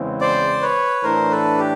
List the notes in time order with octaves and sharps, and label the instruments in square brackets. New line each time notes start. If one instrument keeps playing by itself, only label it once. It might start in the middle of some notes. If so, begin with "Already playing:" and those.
Already playing: [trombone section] E2 C#3 E3 G#3 C4
[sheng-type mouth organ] C5 D5
B4 C#5
[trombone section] A2 E3 A3 D4 [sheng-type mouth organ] A#4 C5
[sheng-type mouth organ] A4 B4
G4